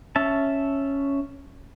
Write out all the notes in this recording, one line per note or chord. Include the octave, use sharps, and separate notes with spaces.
C#4 E5 A5